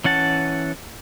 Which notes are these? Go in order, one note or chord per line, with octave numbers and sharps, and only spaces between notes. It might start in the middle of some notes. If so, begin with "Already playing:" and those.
E3 C#4 F#5 A5